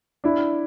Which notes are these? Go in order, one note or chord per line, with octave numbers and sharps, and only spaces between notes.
D4 E4